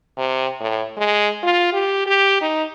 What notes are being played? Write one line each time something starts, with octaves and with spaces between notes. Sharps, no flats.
C3
A2
G#3
F4
G4
G4
D#4